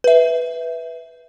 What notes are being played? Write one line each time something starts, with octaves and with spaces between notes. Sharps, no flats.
B4 E5